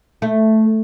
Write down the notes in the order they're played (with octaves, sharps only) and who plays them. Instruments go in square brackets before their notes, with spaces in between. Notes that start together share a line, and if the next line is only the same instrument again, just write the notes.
[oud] A3